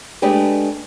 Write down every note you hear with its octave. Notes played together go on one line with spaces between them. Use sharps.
G#3 A3 D4 G4 B4